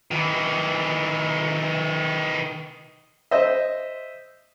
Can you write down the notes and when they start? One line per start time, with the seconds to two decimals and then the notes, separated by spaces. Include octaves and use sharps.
0.11 D#3 E3
3.31 C5 D#5 E5